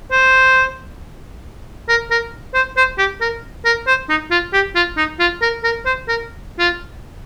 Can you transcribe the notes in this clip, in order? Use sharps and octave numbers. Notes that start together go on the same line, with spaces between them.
C5
A#4
A#4
C5
C5
G4
A#4
A#4
C5
D#4
F4
G4
F4
D#4
F4
A#4
A#4
C5
A#4
F4